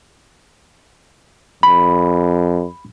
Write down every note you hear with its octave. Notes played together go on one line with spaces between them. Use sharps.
F2 B5